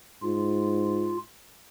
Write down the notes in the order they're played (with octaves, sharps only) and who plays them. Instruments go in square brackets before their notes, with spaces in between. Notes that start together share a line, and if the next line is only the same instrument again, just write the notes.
[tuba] G#2 [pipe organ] F4